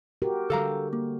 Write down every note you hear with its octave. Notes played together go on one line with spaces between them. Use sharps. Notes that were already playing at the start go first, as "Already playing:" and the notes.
F#4 G4 A#4
D3 G3 A4 F5 A#5
A#3